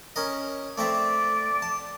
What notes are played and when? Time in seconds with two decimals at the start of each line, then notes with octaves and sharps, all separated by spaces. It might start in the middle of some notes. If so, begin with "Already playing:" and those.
0.16 C#4 A#4 D#5
0.78 A3 C4 D5 E5
1.62 A5